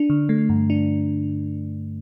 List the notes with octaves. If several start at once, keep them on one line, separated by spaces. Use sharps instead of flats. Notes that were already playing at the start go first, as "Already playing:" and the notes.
Already playing: D4
D3
A3
G2
D4